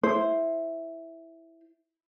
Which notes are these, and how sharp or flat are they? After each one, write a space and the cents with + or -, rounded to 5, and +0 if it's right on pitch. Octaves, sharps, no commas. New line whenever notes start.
E4 +0 C5 +0